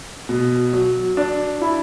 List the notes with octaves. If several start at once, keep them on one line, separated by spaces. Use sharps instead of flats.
B2
F#3
D4
E4